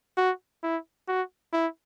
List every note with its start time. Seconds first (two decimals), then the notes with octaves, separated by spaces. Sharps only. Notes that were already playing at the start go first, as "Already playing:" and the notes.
0.17 F#4
0.63 E4
1.08 F#4
1.53 E4